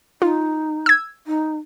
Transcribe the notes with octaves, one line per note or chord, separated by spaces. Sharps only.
D#4 F4
E6 G#6
D#4